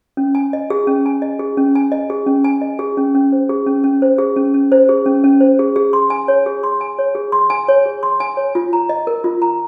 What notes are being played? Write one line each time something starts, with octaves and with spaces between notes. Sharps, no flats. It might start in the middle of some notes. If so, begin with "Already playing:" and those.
C#4
G#5
D#5
G#4
C#4
G#5
D#5
G#4
C#4
G#5
D#5
G#4
C#4
G#5
D#5
G#4
C#4
C#4
C5
G#4
C#4
C#4
C5
G#4
C#4
C#4
C5
G#4
C#4
C#4
C5
G#4
G#4
C6
G#5
C#5
G#4
C6
G#5
C#5
G#4
C6
G#5
C#5
G#4
C6
G#5
C#5
F4
A#5
D#5
A#4
F4
A#5